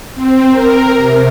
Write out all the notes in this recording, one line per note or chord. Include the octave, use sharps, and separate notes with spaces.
C4
A#4
C3